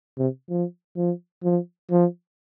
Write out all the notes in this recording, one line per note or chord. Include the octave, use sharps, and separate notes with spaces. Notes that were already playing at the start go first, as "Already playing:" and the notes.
C3
F3
F3
F3
F3